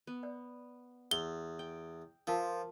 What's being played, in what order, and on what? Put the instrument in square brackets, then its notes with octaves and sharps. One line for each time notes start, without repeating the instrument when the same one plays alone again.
[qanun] B3
[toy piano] D5
[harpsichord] E2 [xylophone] G7
[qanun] G5
[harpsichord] F3 [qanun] F4 [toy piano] A#4 F5 A5